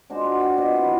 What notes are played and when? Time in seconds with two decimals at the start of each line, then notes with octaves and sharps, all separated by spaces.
0.10 G#3 D4 F#4 C5
0.25 F#4
0.40 D5 E5 G5
0.57 B2 F#4 D#5
0.71 C4 E4
0.85 E3 F#3 D4 F4